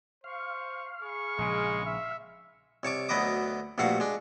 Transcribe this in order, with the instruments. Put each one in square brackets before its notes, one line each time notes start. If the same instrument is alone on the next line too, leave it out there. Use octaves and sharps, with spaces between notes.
[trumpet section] C5 C#6 [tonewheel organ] F5
[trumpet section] G#4 B5 C#6
[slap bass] A#1 C#3 [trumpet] G#3
[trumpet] E5
[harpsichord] C2 C#5 A5 D6
D2 F#3 B3 B4 D#5 D6
A#1 G2 A3 F#4 F5 F#5
G#3 D4